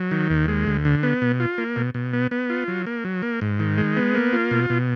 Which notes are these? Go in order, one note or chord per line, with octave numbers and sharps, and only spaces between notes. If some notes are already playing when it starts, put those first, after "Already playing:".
Already playing: F#3
D#3
D#2
G#3
D2
D3
B3
B2
F4
A#3
B2
B2
B3
B3
F4
F#3
A#3
F#3
A#3
G#2
D#3
G#3
B3
A#3
F4
B2
B2